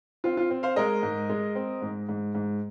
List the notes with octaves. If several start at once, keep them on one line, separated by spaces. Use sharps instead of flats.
C4 F4
F4
C4
C5 F5
G#3 A#4 D#5
G#2
G#3
C4
G#2
G#2
G#2